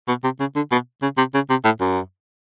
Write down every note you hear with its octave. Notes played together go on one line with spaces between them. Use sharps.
B2
C3
C#3
D3
B2
C#3
C3
C#3
C3
A2
F#2